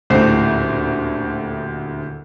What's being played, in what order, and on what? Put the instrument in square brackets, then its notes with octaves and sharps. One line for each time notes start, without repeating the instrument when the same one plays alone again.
[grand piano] D#1 D2 A2 C5 C7